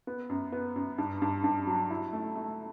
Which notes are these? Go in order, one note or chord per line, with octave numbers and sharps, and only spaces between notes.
B3
F#2
B3
F#2
G2
G2
G2
F#3
E4
A3
A3